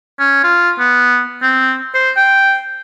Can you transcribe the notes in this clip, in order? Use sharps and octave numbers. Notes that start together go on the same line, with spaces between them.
C#4
F4
B3
C4
C5
G5